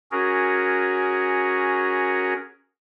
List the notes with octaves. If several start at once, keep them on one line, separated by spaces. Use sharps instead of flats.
C#4 F#4 G#4 A#4